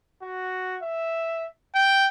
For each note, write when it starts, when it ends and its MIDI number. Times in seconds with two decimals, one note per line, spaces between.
0.23 0.78 66
0.83 1.48 76
1.75 2.07 79